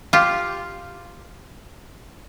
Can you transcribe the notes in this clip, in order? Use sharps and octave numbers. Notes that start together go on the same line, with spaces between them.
F4 G4